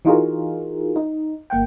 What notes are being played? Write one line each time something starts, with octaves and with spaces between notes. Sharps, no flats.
E3 D#4 F4 F#4 G#4 A#4
D#4
G1 A#3 F#5 G5